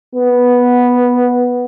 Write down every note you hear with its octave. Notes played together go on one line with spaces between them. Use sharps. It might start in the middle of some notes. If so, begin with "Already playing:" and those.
B3